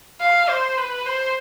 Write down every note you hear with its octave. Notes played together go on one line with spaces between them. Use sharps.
F5
C5
B4
C5